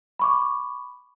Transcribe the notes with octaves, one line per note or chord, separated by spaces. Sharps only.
B5 C#6 D6